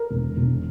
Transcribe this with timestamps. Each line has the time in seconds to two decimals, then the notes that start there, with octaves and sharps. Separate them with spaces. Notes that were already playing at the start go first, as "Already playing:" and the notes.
Already playing: A#4
0.11 E1
0.37 E1